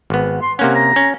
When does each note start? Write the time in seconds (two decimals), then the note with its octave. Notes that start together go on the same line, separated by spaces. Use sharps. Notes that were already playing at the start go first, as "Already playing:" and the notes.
0.10 G#1 B3
0.42 C6
0.59 C3 A#3 C#4 F#5
0.75 A#5
0.96 C#4